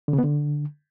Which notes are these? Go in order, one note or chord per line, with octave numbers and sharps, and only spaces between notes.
D3
C#3
B3
D3